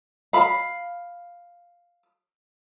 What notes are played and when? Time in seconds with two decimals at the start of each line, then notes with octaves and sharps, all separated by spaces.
0.33 F5 B5